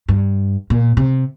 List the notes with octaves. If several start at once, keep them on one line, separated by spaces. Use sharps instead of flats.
G2
A#2
C3